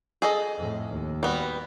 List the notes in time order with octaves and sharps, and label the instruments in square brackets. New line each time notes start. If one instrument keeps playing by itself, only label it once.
[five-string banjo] G#4 A4 D#5
[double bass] F2 A2
D#2
[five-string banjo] G3 B3 F#4